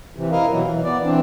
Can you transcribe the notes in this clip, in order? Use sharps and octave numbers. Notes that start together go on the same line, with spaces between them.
C3 E3
E4 A#4 D#5 F5
B2 E3 F#3
E3
B3 D5
E3 C4 D4